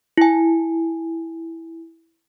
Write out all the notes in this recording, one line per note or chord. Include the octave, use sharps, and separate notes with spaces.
E4 G#5